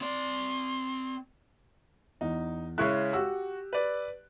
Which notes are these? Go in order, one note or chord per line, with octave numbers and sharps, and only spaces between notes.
C4 D5 C6
E2 D#4
C#3 G#3 E4 C#5 C#6 F#6
F#4 G4 E6
B4 D5